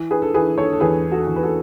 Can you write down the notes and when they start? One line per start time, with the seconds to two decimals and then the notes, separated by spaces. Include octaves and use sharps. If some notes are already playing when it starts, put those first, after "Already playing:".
Already playing: E3
0.11 G#4 B4
0.22 A4
0.34 E3 G#4 B4
0.58 A4 C#5
0.73 A4
0.80 E2 G#4 B4
1.11 F#4 A4
1.27 E2
1.36 B4
1.43 F#4 A4